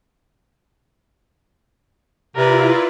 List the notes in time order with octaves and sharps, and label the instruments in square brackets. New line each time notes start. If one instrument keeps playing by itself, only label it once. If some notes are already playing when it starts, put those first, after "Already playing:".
[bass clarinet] C3 [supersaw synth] E4 F4 [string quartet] A#4 B4 D5